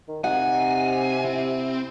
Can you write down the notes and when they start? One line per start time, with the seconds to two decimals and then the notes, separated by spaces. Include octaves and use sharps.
0.08 D#3
0.24 C3 D#4 F#5 G#5
1.25 C4 E4